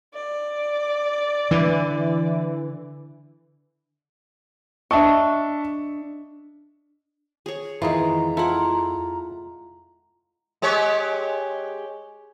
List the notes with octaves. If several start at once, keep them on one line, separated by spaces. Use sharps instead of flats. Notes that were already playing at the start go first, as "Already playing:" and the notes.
D5
D3 E3
D4 D#5 E5 A5 C#6
G#4 C#5
F2 D#3 E3 G#3 E4 F4 A#5
E4 F4 A4 F#5
G#3 G4 C#5